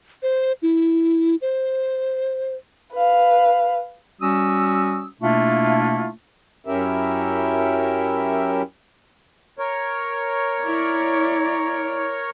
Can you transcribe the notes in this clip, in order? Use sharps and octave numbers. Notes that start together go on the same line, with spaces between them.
C5
E4
C5
B4 F5
G3 C#4 F#4 D#6 E6
B2 A3 A#3 D4 E4 F4
F#2 C#4 E4 G4 A#4 E5
A#4 C#5
E4 D5